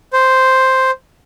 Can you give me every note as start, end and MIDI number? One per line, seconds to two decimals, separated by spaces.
0.13 0.91 72